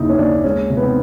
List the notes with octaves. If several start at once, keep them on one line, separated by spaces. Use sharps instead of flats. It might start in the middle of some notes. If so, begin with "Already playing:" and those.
Already playing: F#1 D#2 C#3 D#4 E4
C#4
D#2 D4
G#3 C#4
C3
B3
C4